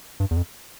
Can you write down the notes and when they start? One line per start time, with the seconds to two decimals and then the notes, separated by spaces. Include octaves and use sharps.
0.20 G2
0.31 E2
0.37 F2